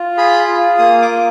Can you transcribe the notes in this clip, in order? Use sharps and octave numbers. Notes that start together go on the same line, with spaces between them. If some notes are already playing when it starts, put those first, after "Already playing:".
Already playing: F4
G#4 B5
F4
A#3 D#6
D6
A#3